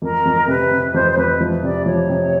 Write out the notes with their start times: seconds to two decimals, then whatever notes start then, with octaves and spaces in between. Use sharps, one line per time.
0.02 F2 A#4
0.25 F2
0.48 C3 B4
0.71 C3
0.94 F2 C5
1.11 C5
1.17 F2 B4
1.40 F3
1.63 C3 D5
1.86 F3 C#5
2.09 C3